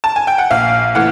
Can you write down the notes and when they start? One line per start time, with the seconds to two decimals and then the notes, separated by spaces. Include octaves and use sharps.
0.04 A5
0.16 G#5
0.27 G5
0.38 F#5
0.50 A#1 F5
0.95 A2 E3 F#5